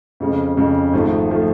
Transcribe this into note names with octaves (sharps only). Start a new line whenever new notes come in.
F2 C#3 G#3
F2 C#3 G#3
G#1 G#2 F3 A3
F3 A3